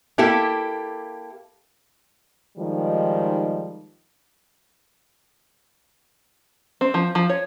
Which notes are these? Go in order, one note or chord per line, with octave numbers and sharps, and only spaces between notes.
A#3 E4 G4 A4
D#3 F3 G3 G#3 D#4
C4
F3
F3
C#5